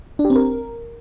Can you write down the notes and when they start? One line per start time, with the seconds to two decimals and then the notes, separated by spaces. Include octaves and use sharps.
0.19 D4
0.25 G4
0.30 C4
0.36 A#4